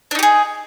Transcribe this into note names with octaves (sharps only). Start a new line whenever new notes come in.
D4 D#4 G4 G#4